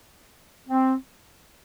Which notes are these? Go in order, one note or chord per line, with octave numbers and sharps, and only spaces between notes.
C4